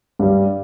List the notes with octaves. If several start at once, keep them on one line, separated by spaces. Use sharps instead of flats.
G2 G3